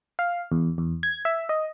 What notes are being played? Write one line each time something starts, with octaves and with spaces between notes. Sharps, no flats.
F5
E2
E2
G#6
E5
D#5